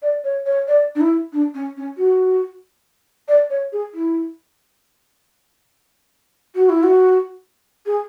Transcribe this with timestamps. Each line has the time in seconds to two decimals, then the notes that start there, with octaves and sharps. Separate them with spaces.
0.02 D5
0.24 C#5
0.46 C#5
0.68 D5
0.95 D4
1.01 E4
1.33 D4
1.54 C#4
1.77 C#4
1.98 F#4
3.28 D5
3.50 C#5
3.72 G#4
3.94 E4
6.55 F#4
6.69 E4
6.83 F#4
7.86 G#4